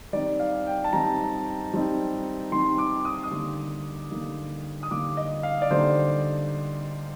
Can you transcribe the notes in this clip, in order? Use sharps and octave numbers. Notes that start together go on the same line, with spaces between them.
D#3 G3 C4 D#4 D5
F5
G5
A5
D#3 G3 C4 D#4 A#5
D#3 G3 C4 D#4
D#3 G3 C4 D#4 C6
D6
D#6
D#6
D3 G3 A#3 D#4
D3 G3 A#3 D#4
D#6
D3 G3 A#3 D#4 D6
D#5
F5
D5
D3 G3 A#3 D#4 C5